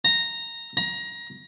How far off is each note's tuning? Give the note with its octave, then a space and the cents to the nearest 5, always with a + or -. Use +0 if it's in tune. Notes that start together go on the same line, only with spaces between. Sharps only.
A#5 -5
A#5 +25